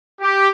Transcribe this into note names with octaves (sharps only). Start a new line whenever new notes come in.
G4